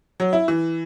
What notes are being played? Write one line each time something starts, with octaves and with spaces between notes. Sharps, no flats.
F#3
E4
E3